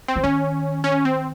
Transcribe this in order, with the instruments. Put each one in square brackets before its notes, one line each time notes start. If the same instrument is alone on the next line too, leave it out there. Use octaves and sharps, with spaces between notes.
[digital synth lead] C4
[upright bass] F3
[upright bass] D#3 [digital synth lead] C#4
[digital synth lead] C#4
C4